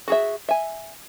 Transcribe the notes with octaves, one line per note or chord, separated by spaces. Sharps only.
F#4 G#4 E5
E5 G#5